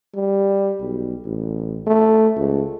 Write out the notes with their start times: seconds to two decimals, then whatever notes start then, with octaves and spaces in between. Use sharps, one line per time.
0.15 G3
0.81 B1
1.24 A1
1.87 A3
2.37 C#2